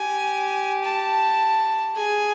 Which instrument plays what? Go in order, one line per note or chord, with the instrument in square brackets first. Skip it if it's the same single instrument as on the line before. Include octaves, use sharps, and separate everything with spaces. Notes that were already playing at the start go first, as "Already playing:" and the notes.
Already playing: [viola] G4 [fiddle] G#5
[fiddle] A5
[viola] G#4 [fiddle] G#5